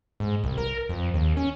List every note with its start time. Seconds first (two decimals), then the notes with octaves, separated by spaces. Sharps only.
0.20 G#2
0.44 C2
0.58 A#4
0.89 F2
1.14 D#2
1.37 C#4